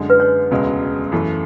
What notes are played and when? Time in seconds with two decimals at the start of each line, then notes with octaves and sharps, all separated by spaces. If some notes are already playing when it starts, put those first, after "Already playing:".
Already playing: F#2 D3 G#3
0.10 B4
0.20 C#5
0.51 E1 D2 C#3 G#3
1.12 F#2 E3 A3